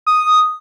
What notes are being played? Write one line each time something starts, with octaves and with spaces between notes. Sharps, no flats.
D#6